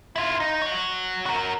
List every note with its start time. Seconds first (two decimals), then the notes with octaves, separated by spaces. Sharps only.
0.16 E4 F4
0.40 D#4
0.62 F#4 C#5
1.26 F#4 A#4